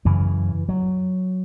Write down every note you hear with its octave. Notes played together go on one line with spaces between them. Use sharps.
F#2 C#3 E3
F#3